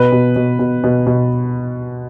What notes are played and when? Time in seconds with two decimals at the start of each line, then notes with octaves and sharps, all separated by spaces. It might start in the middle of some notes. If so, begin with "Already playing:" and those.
Already playing: B2 B4
0.12 B2
0.36 B2
0.59 B2
0.84 B2
1.07 B2